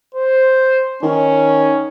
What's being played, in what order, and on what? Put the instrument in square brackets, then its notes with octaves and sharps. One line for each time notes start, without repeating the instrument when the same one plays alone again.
[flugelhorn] C5
[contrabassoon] D#3 [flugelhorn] C#4